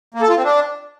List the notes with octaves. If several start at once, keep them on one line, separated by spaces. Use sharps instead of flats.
A#3
A4
F4
C4
D4